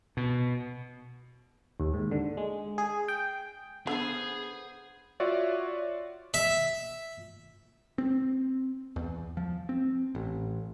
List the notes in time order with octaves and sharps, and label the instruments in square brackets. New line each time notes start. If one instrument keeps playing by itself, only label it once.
[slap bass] B2
[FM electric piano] D#2
G#2
D3
G#3
G#4
G5
[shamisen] D3 [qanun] B3 C5 [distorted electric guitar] G#4
[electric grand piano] F4 F#4 C#5 D5 E5
[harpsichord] E5
[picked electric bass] C4
E2
F3
C4
A1